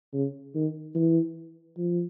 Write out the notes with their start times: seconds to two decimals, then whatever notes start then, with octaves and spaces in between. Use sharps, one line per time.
0.13 C#3
0.55 D#3
0.95 E3
1.77 F3